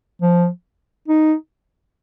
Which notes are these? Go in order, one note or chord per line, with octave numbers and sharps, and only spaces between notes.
F3
D#4